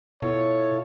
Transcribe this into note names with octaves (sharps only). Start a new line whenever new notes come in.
B2 E4 F4 A4 C#5